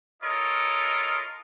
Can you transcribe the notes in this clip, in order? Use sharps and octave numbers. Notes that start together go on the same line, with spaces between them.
E4 F4 A4 A#4 C#5 D#5